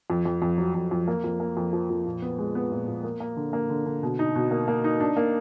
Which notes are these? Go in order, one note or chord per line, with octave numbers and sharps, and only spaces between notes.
F2
F2
F2
F#3
F2
F2
A#3
F2
A#3
F2
F3
F2
A#2
B3
G#3
B3
A#2
A#2
A#3
A#3
D3
A#3
D3
D3
B2
D#4
B2
A#3
A#3
D#4
D4
A#3